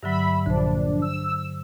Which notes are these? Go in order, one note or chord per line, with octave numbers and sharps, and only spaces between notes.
G2 D3 F#3 E5 B5
A#1 D3 D4 C5
E6